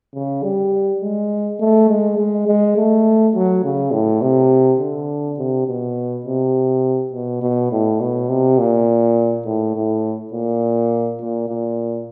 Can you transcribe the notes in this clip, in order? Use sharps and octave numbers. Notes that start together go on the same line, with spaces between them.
C#3
G3
G#3
A3
G#3
G#3
G#3
A3
F#3
C#3
A2
C3
D3
C3
B2
C3
B2
B2
A2
B2
C3
A#2
A2
A2
A#2
A#2
A#2